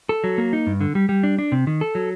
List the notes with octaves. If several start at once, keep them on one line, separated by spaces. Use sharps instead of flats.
A4
F#3
A#3
D#4
G2
D3
G3
G3
D4
D4
C3
D#3
A4
F#3